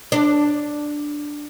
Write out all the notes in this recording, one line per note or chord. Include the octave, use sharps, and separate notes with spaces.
D4